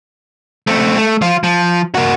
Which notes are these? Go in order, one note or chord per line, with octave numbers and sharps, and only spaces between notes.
A3 C4
A3
F3 F4
F3
A#3 F#4